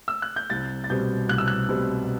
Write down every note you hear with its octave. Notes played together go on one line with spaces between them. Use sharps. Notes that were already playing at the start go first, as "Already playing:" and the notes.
E6
F#6
G6
C2 A6
A6
B2 G3 C4 G6
C2 F#6
E6
F#6
B2 G3 C4